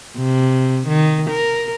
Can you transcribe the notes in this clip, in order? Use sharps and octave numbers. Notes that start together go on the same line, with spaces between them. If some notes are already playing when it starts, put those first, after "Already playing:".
C3
D#3
A#4